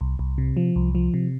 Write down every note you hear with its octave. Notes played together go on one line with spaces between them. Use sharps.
C2
C2
C3
F3
C2
F3
C3